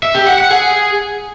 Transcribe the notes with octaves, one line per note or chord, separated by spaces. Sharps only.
E5
G4
F#5
F#5
G#4